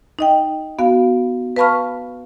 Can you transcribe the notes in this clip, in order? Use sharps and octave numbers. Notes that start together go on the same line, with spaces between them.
D#4 D#5 G5
B3 F#4 F5
B4 F5 A5 B5 C#6 F6